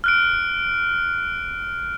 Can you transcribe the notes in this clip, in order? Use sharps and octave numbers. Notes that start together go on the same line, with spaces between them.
F6 F#6 D7